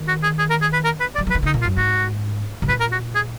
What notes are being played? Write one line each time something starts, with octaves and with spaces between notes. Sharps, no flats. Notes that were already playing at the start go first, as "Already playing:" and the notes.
Already playing: D#3
F#4
G#4
G#4
A#4
G#4
B4
A#4
B4
D5
F#3
F3
B4
D#3
D3
D#4
A#2
F4
F#2
G#2 F#4
B2
A#2 B4
A#4
F#4
G#4